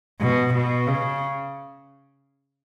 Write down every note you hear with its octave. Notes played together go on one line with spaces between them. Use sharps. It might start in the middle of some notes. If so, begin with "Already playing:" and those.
B2
B2
C#3